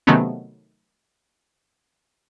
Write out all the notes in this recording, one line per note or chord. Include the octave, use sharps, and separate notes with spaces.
C3 D#3 F#3 A3 B3 C#4